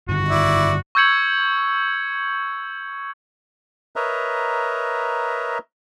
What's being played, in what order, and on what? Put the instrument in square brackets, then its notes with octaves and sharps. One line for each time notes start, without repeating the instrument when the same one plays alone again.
[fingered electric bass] G2 D3 D#3 [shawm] F#4
[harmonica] E4 D5
[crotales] C#6 E6 G6 G#6 C#7 F#7
[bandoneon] A#4 B4 C#5 D#5 E5 A#5